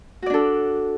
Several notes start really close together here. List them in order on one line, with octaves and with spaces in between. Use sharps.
F#4 D5 D4 A4